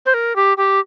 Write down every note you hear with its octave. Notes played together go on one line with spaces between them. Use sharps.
C5
A#4
G4
G4